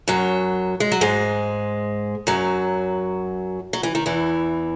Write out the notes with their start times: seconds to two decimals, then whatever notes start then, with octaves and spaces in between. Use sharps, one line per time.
0.08 F#2 F#3
0.80 G#3
0.92 F#3
1.01 G#2 G#3
2.27 F#2 F#3
3.73 F#3
3.83 E3
3.95 D#3
4.06 E2 E3